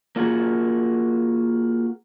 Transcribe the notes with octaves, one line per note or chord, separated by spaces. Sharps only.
A#3 F4 F#4 G#4 A#4